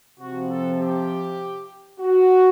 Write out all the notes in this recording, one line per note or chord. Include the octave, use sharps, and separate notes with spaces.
C3 F3 F#4
A4
G4
F#4